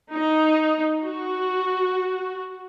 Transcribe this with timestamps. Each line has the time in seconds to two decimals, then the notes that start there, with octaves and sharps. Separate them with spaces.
0.11 D#4
1.04 F#4